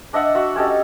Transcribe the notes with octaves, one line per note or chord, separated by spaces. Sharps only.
D4 D#5 E5 F#5
F#4 E5
C#4 G4 A4 D#5